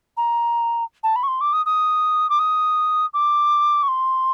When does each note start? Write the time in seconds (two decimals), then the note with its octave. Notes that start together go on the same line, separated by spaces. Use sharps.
0.17 A#5
1.03 A5
1.16 B5
1.23 C#6
1.28 C6
1.41 D6
1.53 D#6
1.66 D#6
2.30 D6
2.39 D#6
3.14 D6
3.83 C#6
3.88 C6